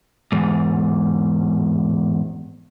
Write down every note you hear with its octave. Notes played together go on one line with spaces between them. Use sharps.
E2 G#2